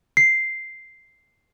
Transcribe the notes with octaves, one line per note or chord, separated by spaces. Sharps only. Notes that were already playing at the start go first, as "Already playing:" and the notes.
C7